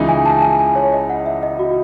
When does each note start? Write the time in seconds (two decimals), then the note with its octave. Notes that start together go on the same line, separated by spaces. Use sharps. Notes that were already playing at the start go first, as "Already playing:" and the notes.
Already playing: C#2 C#3 E3 G#3 D#4
0.09 G#5
0.25 A5
0.42 G#5
0.59 G#5
0.76 C#5
0.93 D#5
1.10 F#5
1.26 E5
1.43 D#5
1.59 F#4